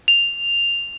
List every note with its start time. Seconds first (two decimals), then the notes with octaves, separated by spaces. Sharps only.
0.08 F7